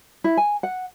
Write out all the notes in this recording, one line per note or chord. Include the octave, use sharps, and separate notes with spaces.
E4
G#5
F#5